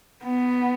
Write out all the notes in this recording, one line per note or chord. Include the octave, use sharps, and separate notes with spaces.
B3